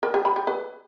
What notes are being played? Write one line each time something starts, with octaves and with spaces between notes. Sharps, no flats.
A#4
G4
B5
G4
B4